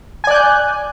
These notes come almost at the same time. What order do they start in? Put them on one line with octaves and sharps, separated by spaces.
G#5 D5 F#6 G6